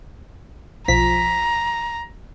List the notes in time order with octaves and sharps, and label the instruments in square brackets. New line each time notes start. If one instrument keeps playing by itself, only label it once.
[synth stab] B1 F3 B6 [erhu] A#5